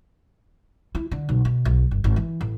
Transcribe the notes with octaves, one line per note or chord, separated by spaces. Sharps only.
E4
D3
B1
B2
B1
G1
G#1
E3
A1